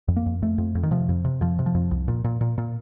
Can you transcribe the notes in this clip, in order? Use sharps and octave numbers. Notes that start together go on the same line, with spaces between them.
F2
A#3
F2
F2 A3
F2
F2
D#3
C3 F3
F2
C3
F2 F3
C3
F3
F2
C2
A#2
A#2
A#2
A#2